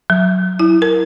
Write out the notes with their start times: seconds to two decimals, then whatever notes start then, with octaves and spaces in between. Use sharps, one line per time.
0.10 F#3
0.59 E4
0.82 A#4